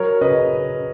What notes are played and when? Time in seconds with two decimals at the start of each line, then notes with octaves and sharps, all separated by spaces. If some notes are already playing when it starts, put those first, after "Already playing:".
Already playing: F#3 A#4 C#5
0.21 C#3 B4 D#5